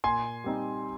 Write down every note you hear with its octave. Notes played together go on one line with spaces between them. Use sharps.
A#2 G#5 C6
G3 C4 D#4